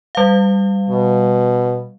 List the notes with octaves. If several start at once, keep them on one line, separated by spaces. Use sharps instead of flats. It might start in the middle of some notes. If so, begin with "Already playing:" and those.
G3 F5
B2